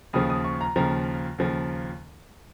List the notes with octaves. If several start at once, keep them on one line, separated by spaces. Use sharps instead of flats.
D#2 C#3 F3 D#6
D#6
C#6
A#5
D#2 C#3 F3 A#5
D#2 C#3 F3